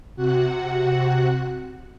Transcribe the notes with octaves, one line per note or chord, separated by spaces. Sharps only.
C3 F#4 F#5